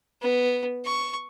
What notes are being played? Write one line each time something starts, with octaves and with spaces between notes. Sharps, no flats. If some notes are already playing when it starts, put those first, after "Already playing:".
B3
C#6